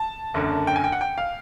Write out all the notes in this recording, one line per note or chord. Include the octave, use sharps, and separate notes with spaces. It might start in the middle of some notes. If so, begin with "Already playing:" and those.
Already playing: A5
F#1 F#2 D3
G5
G#5
G5
F#5
G5
F5